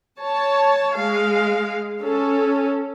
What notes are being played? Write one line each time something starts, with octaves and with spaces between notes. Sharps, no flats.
C#5 A5
G#3 F5
C#4 A4